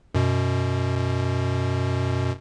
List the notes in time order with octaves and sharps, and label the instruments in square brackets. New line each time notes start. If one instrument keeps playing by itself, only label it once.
[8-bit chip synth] F#2 B2